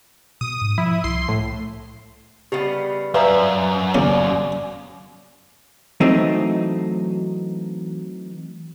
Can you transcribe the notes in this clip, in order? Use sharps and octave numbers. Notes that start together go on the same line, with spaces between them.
B2 D#6
G#2
F3 E4
C2 C6
A2
C#3 G3 B3 G4 D#5
F#2 B4 D5 E5 F5 A#5
D#2 A#2 C#3 D5 F5
E3 F#3 A3 C4 D#4